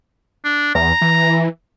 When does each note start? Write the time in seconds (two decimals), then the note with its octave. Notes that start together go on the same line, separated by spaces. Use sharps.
0.45 D4
0.75 E2 A#5
1.01 E3